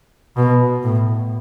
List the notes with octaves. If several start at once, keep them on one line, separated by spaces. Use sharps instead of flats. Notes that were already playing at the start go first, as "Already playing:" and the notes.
B2
A2